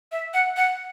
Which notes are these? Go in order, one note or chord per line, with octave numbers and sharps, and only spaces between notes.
E5
F#5
F#5